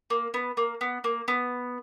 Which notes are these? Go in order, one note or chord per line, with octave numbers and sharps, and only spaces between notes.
A#3
B3
A#3
B3
A#3
B3